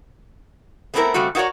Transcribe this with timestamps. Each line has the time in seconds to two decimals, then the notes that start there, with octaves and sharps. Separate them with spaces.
0.94 A3 B3 C4 D#4 E4 A#4
1.14 C#3 G3 A3 C4 F#4
1.35 D#4 E4 F#4 A#4 C#5 D5